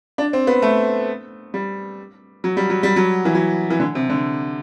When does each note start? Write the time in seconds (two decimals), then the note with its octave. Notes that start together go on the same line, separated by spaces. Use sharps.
0.18 D4
0.33 C4
0.47 B3
0.62 A3
1.54 G3
2.44 F#3
2.57 G3
2.70 F#3
2.83 G3
2.96 F#3
3.25 E3
3.35 F#3
3.70 E3
3.80 D3
3.95 C3
4.10 D3